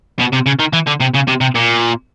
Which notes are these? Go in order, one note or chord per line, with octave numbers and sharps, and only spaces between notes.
B2
C3
C#3
D#3
E3
D3
C3
C#3
C3
C3
A#2